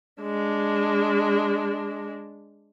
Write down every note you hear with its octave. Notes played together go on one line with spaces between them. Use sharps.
G#3 D4